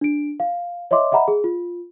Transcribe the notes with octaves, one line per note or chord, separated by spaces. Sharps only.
D4 D7
F5
C#5 D#5 E5 C6 D6
D#5 E5 F#5 A#5 B5
G#4
F4